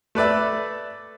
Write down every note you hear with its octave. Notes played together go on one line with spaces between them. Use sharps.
A3 B4 D5 E5